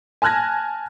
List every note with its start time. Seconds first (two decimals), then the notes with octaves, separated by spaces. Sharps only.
0.22 G#5 A5 F6 F#6 G#6 A#6